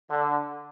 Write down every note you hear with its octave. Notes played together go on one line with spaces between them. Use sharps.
D3